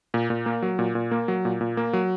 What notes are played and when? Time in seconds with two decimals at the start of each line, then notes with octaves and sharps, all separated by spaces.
0.14 A#2
0.30 A#2
0.46 A#3
0.62 F#3
0.79 A#2
0.95 A#2
1.11 A#3
1.28 F#3
1.45 A#2
1.61 A#2
1.77 A#3
1.93 F#3